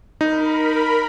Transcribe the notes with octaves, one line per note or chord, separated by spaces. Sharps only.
D#4 A#4 B5